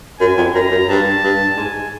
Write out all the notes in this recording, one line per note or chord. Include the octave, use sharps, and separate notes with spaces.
F#2 G#5
F2
F#2 A#5
F#2
G2 A5
G2
G#2 G#5